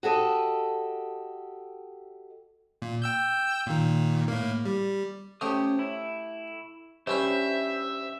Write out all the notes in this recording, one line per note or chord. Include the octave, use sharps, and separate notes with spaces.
F#4 G4 A4 D#5
A#2
G5 E6 G6
A#2 D#3
A2 A#3
G3
A3 C#4 G4 C5 D#6
E4
G2 C#4 E4 C5 E5